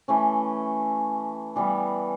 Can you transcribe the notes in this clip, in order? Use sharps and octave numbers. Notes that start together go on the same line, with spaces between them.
E3 A3 C#4
E3 G3 B3